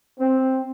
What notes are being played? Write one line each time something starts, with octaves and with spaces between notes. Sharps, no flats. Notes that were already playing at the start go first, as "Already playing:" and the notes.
C4